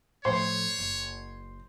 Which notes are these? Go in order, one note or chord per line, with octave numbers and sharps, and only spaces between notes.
A2 F3 C5 C#5
F#1